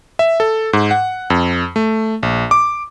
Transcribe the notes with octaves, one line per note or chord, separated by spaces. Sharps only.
E5
A4
G#2
F#5
F2
A3
A#1
D6